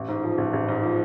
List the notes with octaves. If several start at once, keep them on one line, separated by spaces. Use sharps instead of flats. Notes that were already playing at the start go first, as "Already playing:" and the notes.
Already playing: A1
G#2
F3
A1
A1
G#2
F3